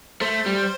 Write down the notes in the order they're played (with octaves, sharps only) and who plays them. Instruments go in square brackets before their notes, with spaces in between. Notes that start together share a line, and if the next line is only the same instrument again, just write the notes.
[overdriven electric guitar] A3 [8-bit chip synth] C5
[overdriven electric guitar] G3